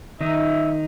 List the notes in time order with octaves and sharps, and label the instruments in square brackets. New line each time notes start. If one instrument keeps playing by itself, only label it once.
[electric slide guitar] D#3 D#4 [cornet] E5